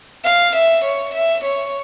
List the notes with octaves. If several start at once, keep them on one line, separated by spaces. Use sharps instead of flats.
F5
E5
C#5
E5
C#5